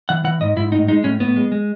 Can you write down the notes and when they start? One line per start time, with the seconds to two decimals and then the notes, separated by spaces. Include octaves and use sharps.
0.09 E3 F#5
0.24 E3 F#5
0.41 G#2 D#5
0.56 G#2 E4
0.72 A2 D#4
0.88 G#3 D#4
1.04 A2 C#4
1.20 A2 B3
1.36 G#3
1.52 G#3